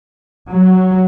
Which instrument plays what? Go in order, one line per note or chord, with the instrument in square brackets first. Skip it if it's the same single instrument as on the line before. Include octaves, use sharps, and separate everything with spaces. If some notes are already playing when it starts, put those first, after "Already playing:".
[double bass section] F#3